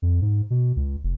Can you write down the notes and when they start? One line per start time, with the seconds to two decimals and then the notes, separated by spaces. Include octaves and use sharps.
0.02 F2
0.22 G#2
0.50 B2
0.76 C#2
1.03 F1